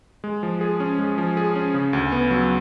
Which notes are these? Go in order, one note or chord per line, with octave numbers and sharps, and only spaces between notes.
G#3
F3
G#4
C#4
G#3
F3
G#4
C#4
C#3
D2
B3
F#3